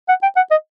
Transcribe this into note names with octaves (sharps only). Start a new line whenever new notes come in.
F#5
G5
F#5
D#5